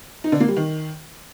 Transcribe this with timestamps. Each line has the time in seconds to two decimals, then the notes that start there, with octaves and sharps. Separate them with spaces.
0.24 D#4
0.32 D3
0.40 A#3
0.48 G3
0.56 D#3